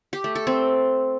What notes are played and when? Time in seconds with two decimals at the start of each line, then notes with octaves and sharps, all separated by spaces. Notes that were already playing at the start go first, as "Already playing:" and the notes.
0.13 G4
0.24 A3
0.35 A4
0.47 C4